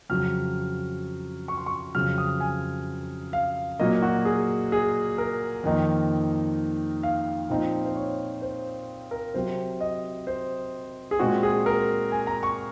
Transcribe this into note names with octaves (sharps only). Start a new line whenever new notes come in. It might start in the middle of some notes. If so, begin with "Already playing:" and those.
F2 C#3 F#3 F6
C#6
C6
C#6
F2 C#3 F#3 F6
D#6
G#5
F5
A#2 F#3 A#3 D#5
F#4
G#4
G#4
A#4
F2 D#3 A#3 D#4
F5
A#2 F3 C4 D#4
C5
C#5
C5
A#4
C3 F#3 C4 C5
D#5
C5
G#4
A#2 G#3 C4 F#4
G#4
A#4
G#5
A#5
C#6